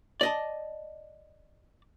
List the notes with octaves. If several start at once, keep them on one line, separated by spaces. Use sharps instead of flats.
D5 D#5 A5